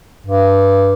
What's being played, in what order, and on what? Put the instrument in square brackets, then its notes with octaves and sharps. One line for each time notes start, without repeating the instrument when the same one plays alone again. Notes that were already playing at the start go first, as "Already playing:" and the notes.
[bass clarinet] G2